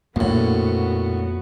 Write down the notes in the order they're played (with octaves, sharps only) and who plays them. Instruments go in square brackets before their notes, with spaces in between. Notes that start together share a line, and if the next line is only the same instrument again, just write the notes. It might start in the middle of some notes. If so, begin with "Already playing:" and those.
[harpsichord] A#1 A2 [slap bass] F2 A#3 [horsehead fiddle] B3 F#4